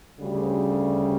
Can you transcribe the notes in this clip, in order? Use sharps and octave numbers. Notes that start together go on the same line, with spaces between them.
D2 C#3 G3